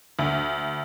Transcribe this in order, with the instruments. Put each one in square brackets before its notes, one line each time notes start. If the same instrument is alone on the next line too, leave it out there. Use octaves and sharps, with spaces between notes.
[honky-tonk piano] D2